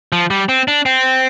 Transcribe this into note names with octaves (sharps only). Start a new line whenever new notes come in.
F3
G3
C4
D4
C4